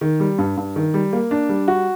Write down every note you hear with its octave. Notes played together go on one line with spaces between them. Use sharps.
D#3
G3
G2
G2
D#3
G3
A#3
D4
G3
F#4